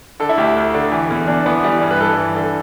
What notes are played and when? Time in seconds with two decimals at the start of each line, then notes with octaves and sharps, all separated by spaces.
0.20 D3 A4
0.29 E4
0.37 D2 G4
0.56 D2
0.74 D3
0.92 E3
1.10 E2
1.27 E2 D4
1.46 E3 B3
1.64 E3 G3
1.81 G2
1.91 B4
2.00 G2 A4
2.18 E3
2.36 D3